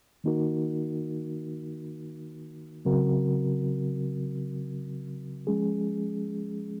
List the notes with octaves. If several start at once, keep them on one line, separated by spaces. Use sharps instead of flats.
D#3 A#3 D#4 F#4 A#4
C#3 F#3 C4 F#4 A#4
F3 G#3 C#4 G#4